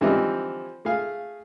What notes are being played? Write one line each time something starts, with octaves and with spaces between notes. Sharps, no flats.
D3 E3 F3 G3 C4 D#4
A3 G#4 F5